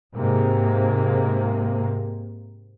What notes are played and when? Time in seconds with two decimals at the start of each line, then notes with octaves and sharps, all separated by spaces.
0.15 G#2 C3 A#3